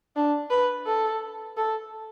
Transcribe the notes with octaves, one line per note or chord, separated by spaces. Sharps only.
D4
B4
A4
A4